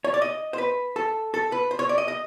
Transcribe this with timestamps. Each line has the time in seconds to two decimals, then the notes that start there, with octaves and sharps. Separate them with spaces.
0.04 C#5
0.14 D5
0.22 D#5
0.53 C5
0.58 B4
0.96 A4
1.34 A4
1.52 B4
1.71 C5
1.79 C#5
1.89 D5
1.98 D#5
2.08 D#5